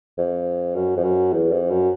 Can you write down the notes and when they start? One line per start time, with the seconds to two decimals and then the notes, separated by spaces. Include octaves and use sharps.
0.18 F2
0.75 F#2
0.97 F2
1.04 F#2
1.33 E2
1.51 F2
1.71 F#2